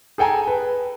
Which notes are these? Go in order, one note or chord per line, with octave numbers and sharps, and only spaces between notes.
G#4 A4 G5 G#5 A#5
B4